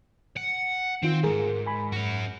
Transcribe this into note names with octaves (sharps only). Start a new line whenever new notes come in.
F#5
D#3 C4 F4
C#2 G#2 G#4 A#4
G#5 B5
G#2 C#4 F#4